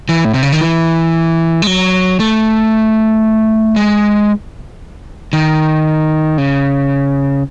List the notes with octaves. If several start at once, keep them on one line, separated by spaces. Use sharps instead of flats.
E3
A2
C3
C#3
D#3
E3
G#3
F#3
A3
G#3
D#3
C#3